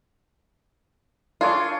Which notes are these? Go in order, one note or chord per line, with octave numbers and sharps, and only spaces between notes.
D4 F4 G#4 C#5